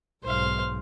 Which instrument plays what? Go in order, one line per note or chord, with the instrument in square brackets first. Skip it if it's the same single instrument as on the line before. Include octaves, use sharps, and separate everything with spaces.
[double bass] B1 G#2 [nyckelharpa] C5 F5